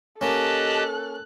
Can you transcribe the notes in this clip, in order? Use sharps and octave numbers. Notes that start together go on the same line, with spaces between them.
A#3 C#4 G4 A4 D#5 A5 F#6